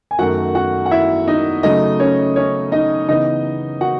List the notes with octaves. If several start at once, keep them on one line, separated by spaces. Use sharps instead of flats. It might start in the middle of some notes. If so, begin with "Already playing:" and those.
G#5
F#2 D#3 A3 F#4 F#5
F#4 F#5
F#5
E4 E5
D#4 D#5
C#3 F#3 A3 D#4 D#5
C#4 C#5
C#4 C#5
D#4 D#5
C#3 E3 B3 D#4 D#5
F#4 F#5